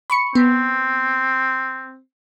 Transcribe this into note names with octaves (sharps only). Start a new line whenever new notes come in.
B5 C#6 C#7
B3 C4